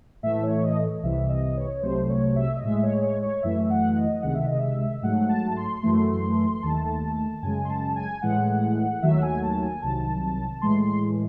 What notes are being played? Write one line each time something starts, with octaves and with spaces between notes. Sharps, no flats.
A2 E3 A3 E5
C#5
D#5
C2 C3 E3 E5
D#5
C#5
C2 C3 F#3 A3 C5
C#5
E5
D#5
A2 G#3 E5
C#5
C#5
C#5
F#2 E3 A3 E5
E5
F#5
D#5
C#2 C3 D#3 G#3 F#5
E5
D#5
E5
E5
G#2 F#3 A3 F#5
A5
C6
F#2 E3 A3
D#2 D#3 A3 A5
F#2 C#3 G#3 G#5
C6
A5
G#5
A2 E3 G#3 F#5
D#2 D#3 F#3 A3 E5
F#5
G#5
A5
G#5
C2 C3 D#3 F#3 A5
A2 E3 G#3 C6
C6